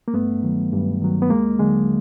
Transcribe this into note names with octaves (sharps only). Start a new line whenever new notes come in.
A#3
G2 A3 B3
D#3 F#3
G2
D#3 F#3
B3
D#2 G#3 A#3
D3 F#3 G#3